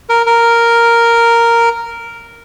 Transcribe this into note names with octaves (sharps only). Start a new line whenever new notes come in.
A#4
A#4